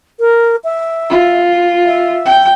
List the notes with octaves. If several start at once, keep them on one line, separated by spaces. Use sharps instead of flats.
A#4
E5
F4
E5
G5